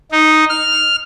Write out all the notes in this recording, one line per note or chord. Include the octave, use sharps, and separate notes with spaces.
D#4
F6